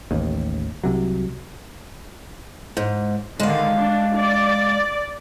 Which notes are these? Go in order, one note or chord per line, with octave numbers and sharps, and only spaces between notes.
A1 D#2
C2 C3 F#3
G#2
D3 D#3 G#3 F5
D4
D5